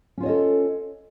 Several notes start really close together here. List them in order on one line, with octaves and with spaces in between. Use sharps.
C#4 F4 C#5 D#5 A4